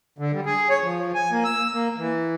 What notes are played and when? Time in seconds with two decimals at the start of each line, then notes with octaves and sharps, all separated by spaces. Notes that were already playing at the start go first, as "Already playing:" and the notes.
0.18 D3
0.33 G3
0.46 G#4
0.70 C#5
0.83 F3
1.14 G#5
1.31 A#3
1.44 E6
1.73 A#3
1.98 E3